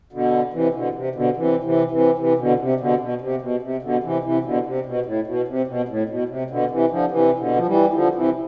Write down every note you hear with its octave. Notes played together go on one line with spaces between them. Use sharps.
B2 D3
C3 E3
B2 D3
C3
B2 D3
C3 E3
C3 E3
C3 E3
C3 E3
B2 D3
C3
B2 D3
B2
C3
B2
C3
B2 D3
C3 E3
C3 E3
B2 D3
C3
B2
A2
B2
C3
B2
A2
B2
C3
B2 D3
C3 E3
D3 F3
C3 E3
B2 D3
F3
E3 G3
E3
D3 F3
C3 E3